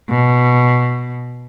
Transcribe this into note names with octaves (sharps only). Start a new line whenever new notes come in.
B2